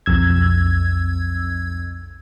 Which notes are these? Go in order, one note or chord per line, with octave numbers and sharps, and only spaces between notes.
B1 F2 E6 G#6